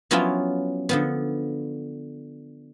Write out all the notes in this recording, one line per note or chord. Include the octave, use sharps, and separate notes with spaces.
F3 F#3 B3 C#4 E4 F4
D3 F3 B3